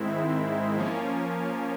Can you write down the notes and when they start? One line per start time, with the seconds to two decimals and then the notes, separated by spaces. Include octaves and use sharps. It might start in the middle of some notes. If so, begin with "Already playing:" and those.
Already playing: G#2 D#3 G#3 C4 E4
0.76 F3 A#3 C#4